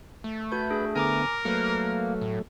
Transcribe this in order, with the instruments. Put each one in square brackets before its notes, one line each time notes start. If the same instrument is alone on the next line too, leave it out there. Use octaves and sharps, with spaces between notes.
[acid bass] A3
[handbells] F#4 G6 [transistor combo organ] B4
[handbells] D4 G#4
[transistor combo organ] D3 B3 [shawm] A#4 [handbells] G#5 A#5 D6
[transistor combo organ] F#3 A3 [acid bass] A#3 [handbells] B4 F6 C#7
[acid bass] A2